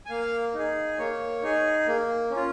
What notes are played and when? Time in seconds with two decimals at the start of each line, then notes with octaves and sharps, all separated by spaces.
0.06 G#5
0.10 A#3 F5
0.54 D#4 G#4
0.98 A#3 C#5
1.43 D#4 G#4
1.87 A#3
2.30 C#4
2.36 F4